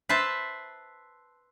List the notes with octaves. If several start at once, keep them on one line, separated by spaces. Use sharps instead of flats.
B4 C5 E5 A5